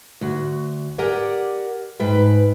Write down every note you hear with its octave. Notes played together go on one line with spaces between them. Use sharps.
D2 F#4
G4 A#4 D5 F#5 G#5
G#2 B4 G5